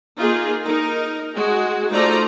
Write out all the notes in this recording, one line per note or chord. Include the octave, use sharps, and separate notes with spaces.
A#3 D#4 F4 G#4
D#4 A#4
G#3 F#4 G#4
A3 D#4 F4 C5 D5 A#5